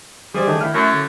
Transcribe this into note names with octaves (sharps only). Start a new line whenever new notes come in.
G3 G#4 C5 D5
D#3 A3 D4
D#3 E4 F6
F#2 A3
D3